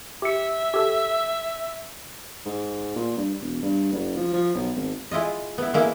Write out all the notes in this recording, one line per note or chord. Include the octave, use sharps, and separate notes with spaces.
G4 E5 C#7
G4 A4
G#2
A#2
G2
E1
G2
F#1
F3
F3
B1
G#1
G#3 E4 F4 D#5
B3 E4
G#3 A#3 E4